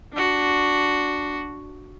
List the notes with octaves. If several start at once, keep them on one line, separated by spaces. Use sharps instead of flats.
D4 F#4